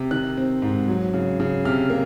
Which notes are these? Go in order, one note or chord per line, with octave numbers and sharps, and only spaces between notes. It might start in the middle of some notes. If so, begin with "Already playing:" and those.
Already playing: C3
D#3 F#6
C4
G#2
F#3
C#3
C#3
C3 F6
A#3